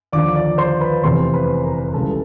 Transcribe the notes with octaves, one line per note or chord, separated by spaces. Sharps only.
D#2 D3 F3 D5 D6
D5 D6
C5 C6
B4 B5
F1 E2 C3 C5 C6
B4 B5
A#4 A#5
C#2 C#3 E3 G3 A4 A5